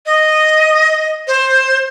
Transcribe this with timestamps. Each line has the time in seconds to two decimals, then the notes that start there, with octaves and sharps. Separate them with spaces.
0.06 D#5
1.27 C5